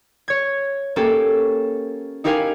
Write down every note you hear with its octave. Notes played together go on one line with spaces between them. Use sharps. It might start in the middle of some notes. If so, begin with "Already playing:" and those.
C#5 G#6
A#3 C#4 G4 A4
D#4 E4 G4 A#4 F5 G#5